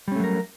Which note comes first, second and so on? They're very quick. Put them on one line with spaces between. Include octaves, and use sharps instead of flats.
G3 C#4 A3 F#3 A#4